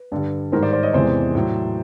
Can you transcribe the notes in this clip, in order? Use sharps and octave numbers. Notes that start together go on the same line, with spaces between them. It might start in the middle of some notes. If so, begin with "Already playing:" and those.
Already playing: B4
G2 D3 G3
G#2 D#3 G3 A#4 C5
C5 D5
C5 D5
C#5 D#5
E2 C3 E3 G#3 C5 D5
A2 F#3